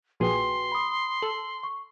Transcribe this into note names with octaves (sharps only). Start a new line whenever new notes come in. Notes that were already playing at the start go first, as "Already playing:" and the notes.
A#1 A#2 F#4 G#4 B4 G5 C6
B5 D#6
A4 F#7
C#6